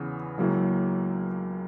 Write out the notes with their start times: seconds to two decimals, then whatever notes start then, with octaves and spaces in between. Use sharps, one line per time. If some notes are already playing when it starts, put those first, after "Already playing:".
Already playing: E2 C#3 E3 B3 E4
0.38 C#2 C#3 F#3 A#3 E4